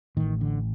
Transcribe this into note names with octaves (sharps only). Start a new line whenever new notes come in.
A1 A2 D#3
D3